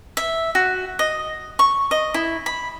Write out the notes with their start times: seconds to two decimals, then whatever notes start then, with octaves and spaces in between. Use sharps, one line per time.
0.17 E5
0.55 F#4
0.99 D#5
1.59 C#6
1.91 D#5
2.14 E4
2.46 B5